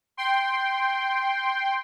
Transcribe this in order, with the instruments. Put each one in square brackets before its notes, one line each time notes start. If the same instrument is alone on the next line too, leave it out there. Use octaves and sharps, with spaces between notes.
[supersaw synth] G5 C6